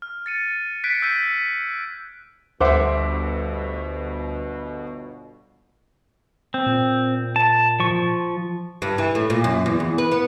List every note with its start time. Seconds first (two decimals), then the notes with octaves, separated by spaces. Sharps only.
0.02 F6
0.26 A6 C#7 D#7
0.84 F#6 G#6 B6 C#7 D7
1.02 E6 G6 B6 D#7
2.61 G1 D2 B2 G3 C5 E5 F#5 D6
6.54 C4
6.66 A#2
7.36 A5
7.80 F3 C#6
8.82 G2
8.98 E3
9.15 A2
9.30 A#2
9.44 F#2
9.66 E2
9.80 E2
9.98 B4
10.12 B3